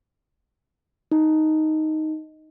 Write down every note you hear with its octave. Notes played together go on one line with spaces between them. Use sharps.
D#4